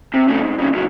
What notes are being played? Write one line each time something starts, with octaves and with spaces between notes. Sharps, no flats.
C3
C#3 A3
G#2
F2 C#3
C#2 F#3